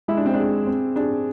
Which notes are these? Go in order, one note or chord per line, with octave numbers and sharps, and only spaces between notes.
G#3 E4
D4
C4
D4 G#4
C4
D4 G#4